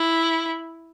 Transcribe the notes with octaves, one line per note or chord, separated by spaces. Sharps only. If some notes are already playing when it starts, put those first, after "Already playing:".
Already playing: E4